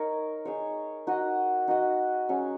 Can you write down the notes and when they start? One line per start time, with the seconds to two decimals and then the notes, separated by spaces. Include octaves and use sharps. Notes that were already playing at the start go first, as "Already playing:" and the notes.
Already playing: D#4 A#4 C#5
0.45 D#4 G#4 C#5
1.07 D#4 F#4 D#5
1.68 D#4 F#4 D#5
2.29 F#3 C#4 G#4 C#5